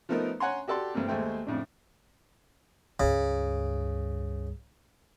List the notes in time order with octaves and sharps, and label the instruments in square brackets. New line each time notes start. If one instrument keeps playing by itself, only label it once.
[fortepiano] F3 A3 B3 D#4 A#4
C#5 F#5 G#5 A#5 C6
F#4 G4 A4 D5 C6
G2 A3 A#3 C4
D#2 G#3 A3 C5 G5
F2 A2 C#3 D4
[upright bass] C#2 G2 [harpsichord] C#3